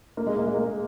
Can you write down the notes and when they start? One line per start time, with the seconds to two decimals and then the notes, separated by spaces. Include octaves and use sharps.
0.17 A#3
0.26 G#3
0.37 A#3
0.46 G#3
0.55 A#3